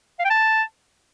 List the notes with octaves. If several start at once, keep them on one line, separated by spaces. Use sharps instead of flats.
F5
G5
A5